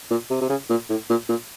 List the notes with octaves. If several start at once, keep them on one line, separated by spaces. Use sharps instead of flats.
A#2
C3
C3
C#3
A#2
A2
A#2
A#2